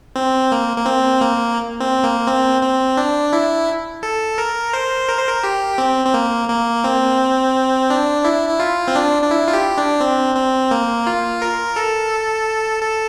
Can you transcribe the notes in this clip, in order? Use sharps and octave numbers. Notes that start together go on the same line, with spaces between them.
C4
A#3
A#3
C4
A#3
C4
A#3
C4
C4
D4
E4
A4
A#4
C5
A#4
C5
A#4
G4
C4
C4
A#3
A#3
C4
D4
E4
E4
F4
C4
D4
D4
E4
F4
G4
D4
C4
C4
A#3
F4
A#4
A4
A4